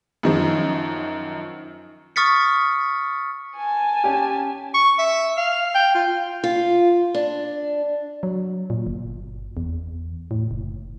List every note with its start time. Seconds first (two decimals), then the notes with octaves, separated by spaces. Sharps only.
0.23 F#2 D#3 F3
2.16 C#6 D#6 F6 A6 B6 C#7
3.56 G#5 A5
4.04 C#4 G4
4.74 C#6
4.99 E5
5.37 F5
5.75 G5
5.95 F4
6.44 F4
7.15 D4
8.23 F#3
8.70 A#2
8.87 G1
9.57 E2
10.31 A2
10.51 F#1